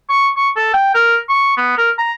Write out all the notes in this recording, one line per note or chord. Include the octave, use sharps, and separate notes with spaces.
C#6
C#6
A4
G5
A#4
C#6
B3
A#4
A#5